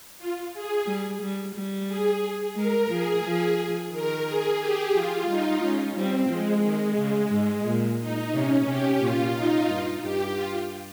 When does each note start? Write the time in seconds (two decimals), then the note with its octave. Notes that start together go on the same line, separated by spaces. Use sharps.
0.19 F4
0.54 G#4
0.87 G3
1.22 G3
1.55 G3
1.88 G#4
2.56 G#3 A#4
2.91 F3 G#4
3.24 F3 G#4
3.92 D#3 A#4
4.26 G#4
4.60 G4
4.94 F3 F4
5.27 G3 D#4
5.61 G#3 C#4
5.95 G3 C4
6.29 F3 G#3
6.63 D#3
6.96 C#3 G#3
7.30 G#2 G#3
7.65 A#2
7.99 D#4
8.33 C3 C#4
8.66 C3 G4
9.00 A#2 F4
9.34 D#4
9.68 G2 F4
10.02 G2 G4
10.35 F4